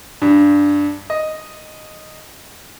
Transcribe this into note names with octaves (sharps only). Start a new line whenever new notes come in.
G2
D#5